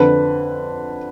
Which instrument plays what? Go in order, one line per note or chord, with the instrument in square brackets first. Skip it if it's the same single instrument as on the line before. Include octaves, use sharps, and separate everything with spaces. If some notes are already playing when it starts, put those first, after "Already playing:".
Already playing: [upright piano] F2 D3 B4